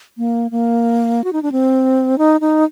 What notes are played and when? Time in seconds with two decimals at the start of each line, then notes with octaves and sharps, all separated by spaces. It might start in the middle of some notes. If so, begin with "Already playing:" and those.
0.18 A#3
0.51 A#3
1.24 F#4
1.33 D#4
1.43 D4
1.52 C4
2.18 D#4
2.41 D#4